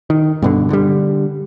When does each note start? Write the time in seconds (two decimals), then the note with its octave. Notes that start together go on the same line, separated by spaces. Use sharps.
0.10 D#3
0.42 G2 B2 D3
0.70 D3 G3